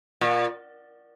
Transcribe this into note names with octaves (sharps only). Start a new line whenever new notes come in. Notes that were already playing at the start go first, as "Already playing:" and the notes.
A#2